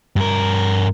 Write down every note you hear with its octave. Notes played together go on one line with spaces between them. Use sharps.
G2 A#4